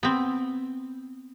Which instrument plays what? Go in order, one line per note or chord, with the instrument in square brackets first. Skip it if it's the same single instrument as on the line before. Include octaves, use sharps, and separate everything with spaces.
[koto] B3 C4